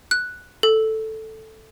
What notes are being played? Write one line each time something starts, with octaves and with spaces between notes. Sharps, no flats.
F#6
A4